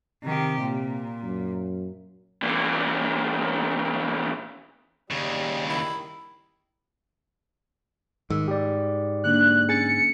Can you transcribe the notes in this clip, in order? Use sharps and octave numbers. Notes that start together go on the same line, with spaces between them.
C3 D#3 G4
A#2
F#2
E2 A#2
D#2 C#3 G3
D#3 E4
G#2 D#3 E6
G4 D5
D3 A#3 D4 F#6
C#4 G#4 G#5 A6 C#7